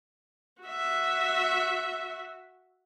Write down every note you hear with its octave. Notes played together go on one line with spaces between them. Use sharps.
F#4 E5